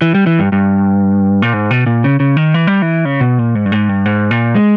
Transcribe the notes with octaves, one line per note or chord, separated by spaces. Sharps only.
E3
G3
E3
G2
G2
A#2
G#2
B2
A#2
C#3
C#3
D#3
E3
G3
E3
C#3
B2
A#2
G#2
G2
G#2
G2
G#2
A#2
G#3